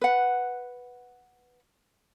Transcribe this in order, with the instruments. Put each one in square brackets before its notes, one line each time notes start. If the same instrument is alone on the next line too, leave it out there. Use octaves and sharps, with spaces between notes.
[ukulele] B4 F#5